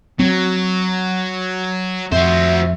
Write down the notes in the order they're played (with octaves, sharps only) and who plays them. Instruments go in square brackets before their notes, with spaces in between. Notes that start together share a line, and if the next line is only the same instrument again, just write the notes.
[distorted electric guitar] F#3 [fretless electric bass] C4
[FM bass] F2 [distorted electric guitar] F#4 C5 [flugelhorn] E5